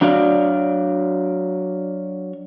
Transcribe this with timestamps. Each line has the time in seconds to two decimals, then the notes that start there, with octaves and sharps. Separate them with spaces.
0.01 F#3 D4 F#4 D5 F5